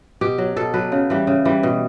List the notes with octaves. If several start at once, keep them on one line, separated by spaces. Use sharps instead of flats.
B2 G4
F#3
B2 A4
F#3 B4
C#3
E3 G3
C#3
E3 G3
B2